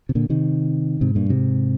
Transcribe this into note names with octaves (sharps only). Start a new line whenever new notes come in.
C3
A#2 D3
C3 D#3
G#2 C3
G2 A#2
G#2 C3